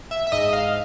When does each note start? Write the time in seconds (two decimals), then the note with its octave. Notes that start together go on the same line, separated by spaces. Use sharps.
0.11 E5
0.27 E5
0.32 G#2 D#5
0.53 F5